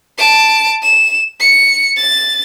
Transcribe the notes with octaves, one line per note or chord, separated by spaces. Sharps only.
A5 D7
E7
C#7
A6